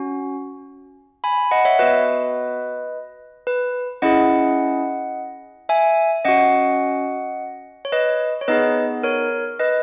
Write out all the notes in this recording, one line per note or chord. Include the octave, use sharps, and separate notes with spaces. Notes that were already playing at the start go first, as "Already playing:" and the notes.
Already playing: C#4 F#4
G#5 B5
D#5 F#5
C#5 E5
B3 F#4 B4 D#5
B4
C#4 E4 G#4 D#5 F#5
E5 G#5
C#4 F#4 D#5 F#5
C#5
B4 D#5
C#5
B3 D#4 G#4 B4 D#5
A#4 C#5
B4 D#5